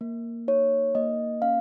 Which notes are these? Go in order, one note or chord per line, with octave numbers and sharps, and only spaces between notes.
A#3
D#4 C#5
A#3 D#5
C#4 F5